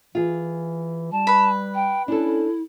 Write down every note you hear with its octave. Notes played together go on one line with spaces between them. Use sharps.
E3 F4 G#4
G3 A5
B4 B5
G5
C#4 D4 E4 A4